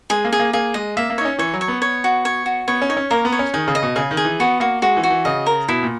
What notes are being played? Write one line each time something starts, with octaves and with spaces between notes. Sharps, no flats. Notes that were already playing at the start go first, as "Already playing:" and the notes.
G#3 G#4
A#3
G#4
A#3
A#3 G#4
G#3 D#5
A#3 E5
A#3
D#4 C#5
C#4
E3 C#5
F#3
C#5
B3
C#5
F#4
C#5
F#4
B3 C#5
C#4
D#4 C#5
C#4
A#3 A#4
B3
C#5
C#4
D#3 G#4
C#3
D#5
B2
C#3 G#4
D#3
G#4
E3
B3 F#4
A#3 F#4
G#3 F#4
E3
F#4
E3
C#3 D#5
A#4
B2 E4
A#2